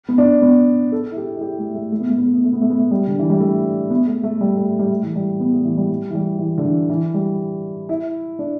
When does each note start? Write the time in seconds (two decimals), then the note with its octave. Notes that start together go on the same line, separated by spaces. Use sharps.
0.09 B3
0.18 D4
0.42 B3
0.92 A4
1.11 E4
1.17 G4
1.36 E4
1.41 G4
1.58 A3
1.75 A3
1.92 A3
2.00 B3
2.09 A3
2.18 B3
2.26 A3
2.36 B3
2.44 A3
2.53 B3
2.61 A3
2.70 B3
2.79 A3
2.91 G3
3.07 D3
3.19 E3
3.30 G3
3.40 A3
3.90 B3
4.07 A3
4.24 A3
4.41 G3
4.56 A3
4.79 G3
4.90 A3
5.03 E3
5.16 G3
5.40 B3
5.53 A3
5.65 E3
5.77 G3
5.90 G3
6.11 E3
6.14 G3
6.39 E3
6.58 D3
6.65 E3
6.90 E3
7.14 G3
7.89 E4
8.39 D4